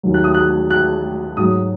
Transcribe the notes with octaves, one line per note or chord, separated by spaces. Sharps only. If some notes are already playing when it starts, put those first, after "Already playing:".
D#2 D#3 F#3
F#6
D#6
F#6
F#6
G#2 F#3 D#6